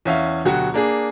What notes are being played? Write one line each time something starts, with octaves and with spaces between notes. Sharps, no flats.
E2 C#4 E5 F5
D2 B2 F#3 F#4 G4
A#3 D4 G#4